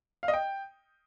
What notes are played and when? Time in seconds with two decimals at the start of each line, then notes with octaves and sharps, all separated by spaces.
0.23 F5
0.28 D#5
0.34 G5